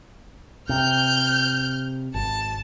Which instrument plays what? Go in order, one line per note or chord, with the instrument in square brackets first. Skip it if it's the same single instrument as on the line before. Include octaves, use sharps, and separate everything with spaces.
[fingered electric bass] C3 [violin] F6 G6
[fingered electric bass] G#1 [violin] A5